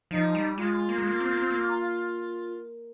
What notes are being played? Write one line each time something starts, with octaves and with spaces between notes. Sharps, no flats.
F3 D#4
G3
G#3 F4
A#3
G#3
A#3
C4
A#3
C4
A#3